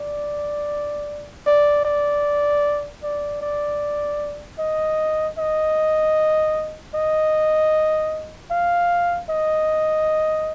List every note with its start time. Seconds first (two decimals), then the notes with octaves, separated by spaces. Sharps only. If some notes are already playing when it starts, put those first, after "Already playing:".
Already playing: D5
1.47 D5
1.85 D5
3.03 D5
3.42 D5
4.59 D#5
5.38 D#5
6.95 D#5
8.51 F5
9.30 D#5